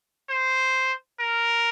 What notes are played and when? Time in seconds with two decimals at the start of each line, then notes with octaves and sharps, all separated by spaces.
0.29 C5
1.20 A#4